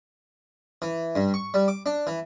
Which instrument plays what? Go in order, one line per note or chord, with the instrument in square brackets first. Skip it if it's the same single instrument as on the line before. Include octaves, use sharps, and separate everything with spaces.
[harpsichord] E3
G2
C#6
G3
D6
D4
E3